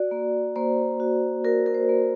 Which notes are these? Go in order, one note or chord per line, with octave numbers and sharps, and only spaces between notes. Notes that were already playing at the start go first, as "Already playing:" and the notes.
Already playing: F#4 D5
A#3
A#3 C5
F#4
F#4 A#4
A#4
C5
A#3